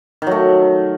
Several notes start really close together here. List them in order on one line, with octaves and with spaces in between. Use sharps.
D#3 F#3 A3